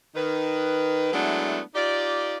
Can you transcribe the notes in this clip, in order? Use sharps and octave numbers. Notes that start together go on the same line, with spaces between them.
D#3 B4
F#3 G#3 A3 B3 D4 E4
D#4 F4 G4 D5